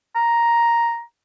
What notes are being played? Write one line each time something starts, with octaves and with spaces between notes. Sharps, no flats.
A#5